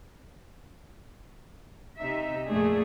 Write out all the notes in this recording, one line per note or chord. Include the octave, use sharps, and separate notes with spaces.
C3 D#4 E5
F2 A#2 A3 D4 G#4